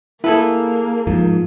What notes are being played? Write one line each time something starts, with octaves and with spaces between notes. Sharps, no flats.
A#3 E4 G#4 A4 B4
G#2 F3